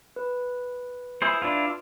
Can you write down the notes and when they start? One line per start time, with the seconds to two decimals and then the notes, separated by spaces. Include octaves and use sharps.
0.16 B4
1.22 E4 G#4 C5
1.42 D4 E4 F4